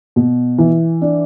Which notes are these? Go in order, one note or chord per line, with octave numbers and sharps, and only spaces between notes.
B2
E3
D4